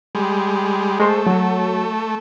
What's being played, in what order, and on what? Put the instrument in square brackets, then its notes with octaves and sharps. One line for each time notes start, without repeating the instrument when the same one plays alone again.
[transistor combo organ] G3 G#3
[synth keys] G#3 C5 [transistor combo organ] A3
[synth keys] F#3